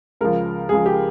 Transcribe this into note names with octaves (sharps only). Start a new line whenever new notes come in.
C#2 C#3 F3 A#4
C#2 C#3 F3 G#4
G4